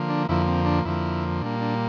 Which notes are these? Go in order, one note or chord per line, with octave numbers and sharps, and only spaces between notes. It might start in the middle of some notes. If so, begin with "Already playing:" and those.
Already playing: D3 F3 A#3
D4
F2 D3 F3 A#3 E4
C4
D4
F2 D3 F3 A#3 E4
A#2 G3 A#3 D4
D4